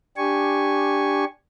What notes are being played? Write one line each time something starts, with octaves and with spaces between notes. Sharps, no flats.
D4 G4 G#5 C#6